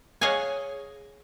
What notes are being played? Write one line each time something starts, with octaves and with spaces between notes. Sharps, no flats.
G#4 C#5 D#5 F5 F#5 G#5